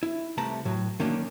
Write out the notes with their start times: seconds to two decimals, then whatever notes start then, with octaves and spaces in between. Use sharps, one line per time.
0.03 E4
0.37 C2 C3 A3 B4 A5 A#5
0.65 A2 F#3
1.00 D#3 F#3 A#3 C#4 D4